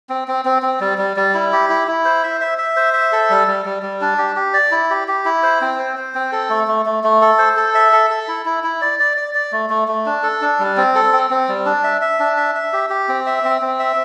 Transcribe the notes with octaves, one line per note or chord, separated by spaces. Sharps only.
C4
C4
C4
C4
G3
G3
G3
E4
G4
E4
E4
C5
E5
E5
E5
C5
E5
A4
G3
G3
G3
G3
D4
G4
G4
D5
E4
G4
G4
E4
C5
C4
C5
C5
C4
A4
A3
A3
A3
A3
A4
C5
A4
E5
A4
A4
E4
E4
E4
D5
D5
D5
D5
A3
A3
A3
D4
A4
D4
G3
C4
A4
C4
C4
G3
D4
E5
E5
D4
E5
E5
G4
G4
C4
E5
C4
C4
E5